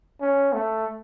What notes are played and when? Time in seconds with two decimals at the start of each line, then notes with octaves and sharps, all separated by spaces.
0.21 C#4
0.53 A3